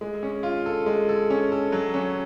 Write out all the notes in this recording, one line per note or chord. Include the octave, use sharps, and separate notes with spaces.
G#3
C#4
F4
A4
G#3
A4
C#4
A4
F#3
C#4